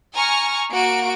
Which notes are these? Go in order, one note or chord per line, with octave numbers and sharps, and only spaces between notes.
G#5 A#5 C#6 F6
A#3 F#4 D7